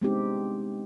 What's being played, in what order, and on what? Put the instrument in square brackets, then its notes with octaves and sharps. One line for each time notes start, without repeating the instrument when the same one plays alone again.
[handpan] G#3 B3 C4 D4 D#4 G4